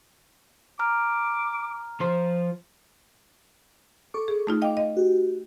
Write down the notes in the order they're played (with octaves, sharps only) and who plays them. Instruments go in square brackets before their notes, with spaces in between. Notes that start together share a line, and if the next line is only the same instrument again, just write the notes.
[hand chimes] A#5 F6 [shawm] D6
[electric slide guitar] F3 F4 C5
[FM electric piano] A4 C#6 D6
[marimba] G#4
A3 D#4 F4
[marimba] D#5 G5 [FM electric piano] F5 D6
[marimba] D#5
[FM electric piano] F#4 G4